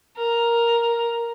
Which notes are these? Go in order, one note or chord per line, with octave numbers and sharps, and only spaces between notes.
A#4